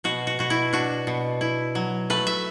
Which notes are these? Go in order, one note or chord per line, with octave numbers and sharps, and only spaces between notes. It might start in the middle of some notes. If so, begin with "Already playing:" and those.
B2 F#4
F#4
B2 F#4
E4
D4 F#4
B2
E4
F#3
A3 B4
E5